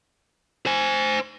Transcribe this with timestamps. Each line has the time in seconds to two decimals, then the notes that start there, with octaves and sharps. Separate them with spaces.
0.66 C5 G#5